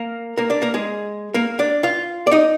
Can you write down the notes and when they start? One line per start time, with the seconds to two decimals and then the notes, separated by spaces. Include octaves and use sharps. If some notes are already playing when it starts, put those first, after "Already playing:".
Already playing: A#3 A#4
0.37 A#3 A#4
0.50 D4 D5
0.62 A#3 A#4
0.74 G#3 G#4
1.34 A#3 A#4
1.59 D4 D5
1.83 F4 F5
2.27 D5
2.31 D#4 D#5